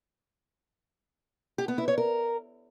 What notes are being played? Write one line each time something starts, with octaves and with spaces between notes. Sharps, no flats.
G4
B3
E4
C#5
A#4